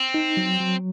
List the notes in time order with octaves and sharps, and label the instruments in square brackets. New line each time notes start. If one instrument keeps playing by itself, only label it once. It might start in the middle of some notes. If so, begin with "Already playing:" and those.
Already playing: [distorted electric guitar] C4
[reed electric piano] D#4
F#3
F#3